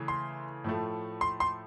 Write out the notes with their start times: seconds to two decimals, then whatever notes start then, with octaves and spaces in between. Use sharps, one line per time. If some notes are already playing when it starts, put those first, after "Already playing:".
Already playing: C#3 E3 A3
0.08 C6
0.64 A2 F3 A3
1.21 C6
1.40 C6